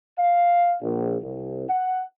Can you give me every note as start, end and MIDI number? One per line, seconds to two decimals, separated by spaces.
0.18 0.74 77
0.81 1.16 34
1.22 1.66 36
1.69 2.01 78